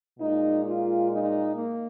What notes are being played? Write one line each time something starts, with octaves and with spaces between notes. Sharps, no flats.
A#2 G#3 D#4
F4
D#4
A#3